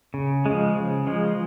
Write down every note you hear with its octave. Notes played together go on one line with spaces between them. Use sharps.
C#3
F3 G#3
C#3
F3 G#3